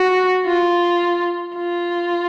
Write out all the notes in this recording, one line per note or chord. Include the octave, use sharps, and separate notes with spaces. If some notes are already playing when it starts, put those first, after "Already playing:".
Already playing: F#4
F4
F4